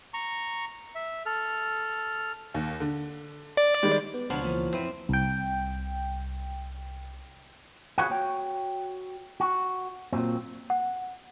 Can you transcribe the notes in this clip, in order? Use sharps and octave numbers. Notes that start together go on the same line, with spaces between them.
A#5 C#6
E5
A4 F6
D#2
D3
D5
D#3 G3 G#3
B3
C#2 B2 F3 F#3 D4 F#5 B5
E3 A#3 F4
F2 C4 E4 B4
C2 G5
F#4 G#4 B4 C#5 F5 F#5
F#4 C#5 G5
F#4
A#2 F#3 C4
F#5